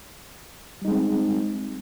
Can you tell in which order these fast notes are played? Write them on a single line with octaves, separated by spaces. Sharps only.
G3 D#4 G#3 C4